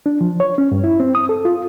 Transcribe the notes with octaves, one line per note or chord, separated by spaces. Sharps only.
D4
F3
C#5
C#4
G2
E4
C4
D#6
A4
F4